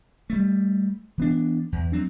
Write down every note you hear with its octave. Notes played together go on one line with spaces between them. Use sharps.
G3 A3
E3 B3 D4
E2
F#3 C4 D4